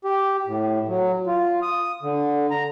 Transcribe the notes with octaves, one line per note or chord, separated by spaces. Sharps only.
G4
A2
F#3
F4
D#6
D3
A#5